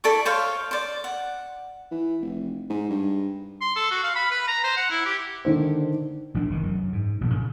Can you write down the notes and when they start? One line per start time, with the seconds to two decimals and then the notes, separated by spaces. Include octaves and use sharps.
0.04 E4 A4 D5 C#6
0.25 C5 C#5 F5 C6
0.71 C5 D5
1.04 F#5
1.91 E3
2.21 F1
2.69 G#2
2.90 G2
3.61 C6
3.76 A4
3.91 F#4
4.03 F5
4.16 B5
4.31 B4
4.48 A#5
4.64 C5
4.77 F#5
4.91 E4
5.06 G4
5.45 D3 D#3 C5
6.34 A1 F3 D4
6.50 F1 D#3 E3
6.63 F#2
6.93 G#2
7.21 A1 G2 A#2 F3
7.34 C#3